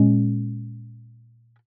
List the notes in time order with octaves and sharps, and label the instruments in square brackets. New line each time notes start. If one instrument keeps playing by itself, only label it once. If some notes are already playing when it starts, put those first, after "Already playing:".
Already playing: [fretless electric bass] A#2 G#3 C#4